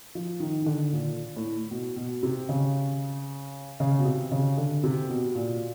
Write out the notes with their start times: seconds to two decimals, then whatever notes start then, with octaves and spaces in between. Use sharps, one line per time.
0.15 F3
0.40 D#3
0.62 D#3
0.66 D3
0.93 A#2
1.36 A2
1.71 B2
1.96 B2
2.23 C3
2.49 C#3
3.80 C#3
3.98 B2
4.05 C3
4.32 C#3
4.58 D3
4.83 C3
5.09 B2
5.35 A#2